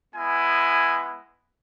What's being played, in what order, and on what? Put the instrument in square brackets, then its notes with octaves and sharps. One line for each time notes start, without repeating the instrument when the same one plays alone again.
[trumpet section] G#3 B3 E4 G#5